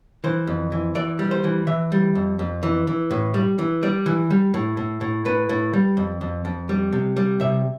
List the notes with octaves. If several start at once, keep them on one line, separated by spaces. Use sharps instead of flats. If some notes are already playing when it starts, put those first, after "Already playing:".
E3 C5
F2
E3
E3 D5
G3
C5
E3
E3 E5
G3
F2
F2
E3
E3
A2
G3
E3
G3 D5
E3
G3
A2
A2
A2
A2 B4
A2
G3
F2
F2
F2
G3
C3
G3
C3 E5